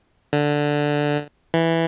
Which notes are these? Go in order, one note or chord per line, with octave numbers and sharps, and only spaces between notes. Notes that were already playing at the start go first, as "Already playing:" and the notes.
D3
E3